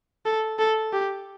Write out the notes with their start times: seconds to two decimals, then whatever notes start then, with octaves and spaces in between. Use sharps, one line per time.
0.25 A4
0.59 A4
0.93 G4